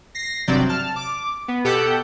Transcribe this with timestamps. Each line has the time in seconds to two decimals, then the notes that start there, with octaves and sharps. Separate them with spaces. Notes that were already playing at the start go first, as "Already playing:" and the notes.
0.15 A#6 C7
0.47 G#1 G2 C3 F#3 D5 G6
0.69 A5 F6
0.96 D6
1.48 B3
1.64 B2 G4 A4 F#5 G6